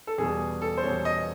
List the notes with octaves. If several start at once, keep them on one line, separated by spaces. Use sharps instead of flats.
A4
E2 B2 G3 G#4
A4
C5
E2 B2 G3 C#5
D#5